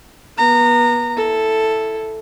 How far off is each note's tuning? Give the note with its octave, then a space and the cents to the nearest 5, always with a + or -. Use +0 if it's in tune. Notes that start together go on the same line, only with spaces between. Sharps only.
B3 -35 A#5 -20
E4 +0 A4 +0